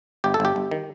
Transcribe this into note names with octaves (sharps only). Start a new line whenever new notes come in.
G1 G4
A4
G1 G4
G1
D#3